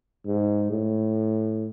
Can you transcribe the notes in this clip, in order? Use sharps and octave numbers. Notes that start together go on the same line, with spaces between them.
G#2
A2